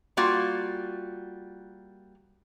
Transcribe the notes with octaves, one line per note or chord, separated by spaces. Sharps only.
G3 A#3 F4 F#4